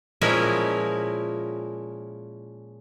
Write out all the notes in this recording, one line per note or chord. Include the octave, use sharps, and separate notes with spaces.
A#2 F3 G#3 C#4 E4 A#4